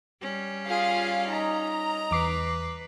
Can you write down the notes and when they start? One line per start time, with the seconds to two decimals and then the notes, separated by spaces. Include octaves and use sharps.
0.22 G3 C#4
0.66 F4 G#4 F5
1.26 D#4 D#5 A#5
2.11 E2 B4 D6 C7